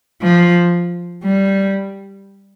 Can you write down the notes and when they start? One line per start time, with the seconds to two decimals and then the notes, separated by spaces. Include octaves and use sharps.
0.22 F3
1.23 G3